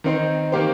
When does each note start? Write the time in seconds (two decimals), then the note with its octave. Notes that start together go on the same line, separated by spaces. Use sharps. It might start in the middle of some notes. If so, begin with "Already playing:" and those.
0.04 D#3 C4 D#4 C5
0.52 D#3 A#3 G4 C5